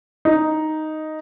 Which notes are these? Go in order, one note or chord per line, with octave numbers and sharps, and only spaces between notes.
D#4